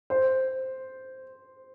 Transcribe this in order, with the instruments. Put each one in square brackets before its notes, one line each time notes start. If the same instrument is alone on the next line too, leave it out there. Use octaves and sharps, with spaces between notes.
[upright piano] C5